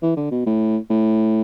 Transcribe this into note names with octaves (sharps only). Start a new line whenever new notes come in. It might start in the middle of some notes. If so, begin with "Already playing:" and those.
E3
D3
B2
A2
A2